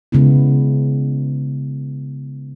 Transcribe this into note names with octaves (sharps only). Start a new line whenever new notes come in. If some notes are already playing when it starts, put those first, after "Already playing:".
C#3 G#3 B3 E4